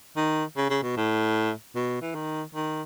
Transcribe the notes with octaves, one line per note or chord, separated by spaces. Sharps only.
D#3
C#3
C#3
B2
A2
B2
E3
D#3
D#3